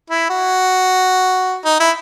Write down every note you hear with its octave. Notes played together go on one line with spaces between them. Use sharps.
E4
F#4
D#4
E4